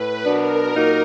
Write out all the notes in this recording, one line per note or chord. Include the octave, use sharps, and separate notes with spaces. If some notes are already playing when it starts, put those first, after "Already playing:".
Already playing: A2 B4
B2 F#3 B3 D4 A#4
A#2 F#3 A#3 D#4